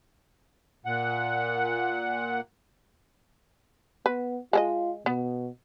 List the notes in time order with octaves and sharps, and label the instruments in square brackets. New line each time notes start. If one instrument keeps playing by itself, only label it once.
[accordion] A#2 F#5
[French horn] B3 [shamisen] B4
[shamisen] G#3 G#4 D#5 [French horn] F4
[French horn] B2 [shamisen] B3